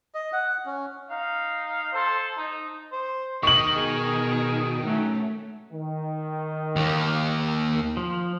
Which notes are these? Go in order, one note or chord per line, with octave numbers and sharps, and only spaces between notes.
D#5
F#5
C#4
D#4 F5
A4 C5
D#4
C5
D#3 D#5 C#6 F#7
B2 G#4
F#3 A3 C#4
D#3
D#2 A#3
F3